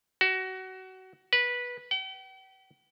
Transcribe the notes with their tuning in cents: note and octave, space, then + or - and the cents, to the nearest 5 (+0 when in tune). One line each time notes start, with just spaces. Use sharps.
F#4 +25
B4 -15
G5 -45